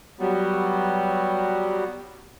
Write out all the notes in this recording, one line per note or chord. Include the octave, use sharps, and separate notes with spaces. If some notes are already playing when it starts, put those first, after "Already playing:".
F#3 G3 B3